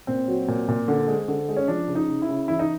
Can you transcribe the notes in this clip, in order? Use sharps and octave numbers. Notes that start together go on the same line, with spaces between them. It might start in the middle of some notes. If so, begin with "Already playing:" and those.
A#2 C4
F#3
A#2
A#2
D3
G#3
D3
G#3
C#4
F3 D4
C#3
D#4
C#3
E4
C#3
E3 E4
D#4